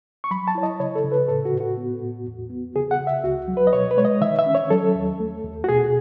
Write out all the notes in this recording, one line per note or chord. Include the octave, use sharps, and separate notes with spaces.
C#6
F#3 B5
A5
E4 C#5
D#5
C#3 C#5
A4
C#3
B4
A2 A4
F#4
A2
F#4
B3
A2
E2
B3
C#3 G#4
F#5
C#3
E5
C#2 F#4
F#3
B4
D#5
B2 C#5
B4
G#3 C#5
D#5
D#3 E5
E5
C#4
C#5
F#3 A4
D#2
A3
D#2
F#4
B2 G#4